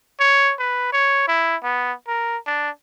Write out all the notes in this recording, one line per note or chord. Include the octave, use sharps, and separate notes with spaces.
C#5
B4
C#5
E4
B3
A#4
D4